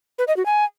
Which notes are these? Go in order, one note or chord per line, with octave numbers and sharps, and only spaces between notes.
B4
D#5
F#4
G#5